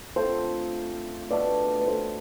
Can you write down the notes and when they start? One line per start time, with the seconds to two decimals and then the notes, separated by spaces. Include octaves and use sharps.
0.16 D3 A3 C4 F4 A4 C5
1.30 B2 A3 D4 B4 D5
1.79 B4
1.87 A4 C5